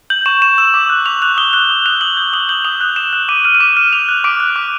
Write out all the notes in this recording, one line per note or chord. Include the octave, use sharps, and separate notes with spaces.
G6 F#7
C#6 E7
C#6 E7
E6 E7
D6
F#6
D6 F7
F#6 F7
D#6 G7
F#6 G7
D#6
F#6 F7
D#6 F#7
G6
D#6 F#7
G6 F#7
D#6 F7
F#6 F7
D#6 E7
F#6
D6 D#7
F6 D#7
D#7
D6 E7
F6 D#7
D6 F7
F#6
D6 D7
F#6
D6